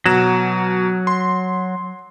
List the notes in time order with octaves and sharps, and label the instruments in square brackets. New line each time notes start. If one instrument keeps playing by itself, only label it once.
[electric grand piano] B2 A#5 E7 [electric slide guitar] F#3
[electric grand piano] C6